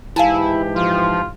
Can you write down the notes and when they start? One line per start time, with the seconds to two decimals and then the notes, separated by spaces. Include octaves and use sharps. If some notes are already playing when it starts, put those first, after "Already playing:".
0.16 G#2 E3 E4 G4 F5 G#5 A5
0.76 F3 F4